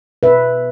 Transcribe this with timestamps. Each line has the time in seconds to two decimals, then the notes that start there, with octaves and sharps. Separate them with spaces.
0.23 B2 B4 E5